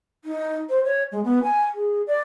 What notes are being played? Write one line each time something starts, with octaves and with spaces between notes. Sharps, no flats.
D#4
C5
C#5
G#3
B3
G#5
G#4
D5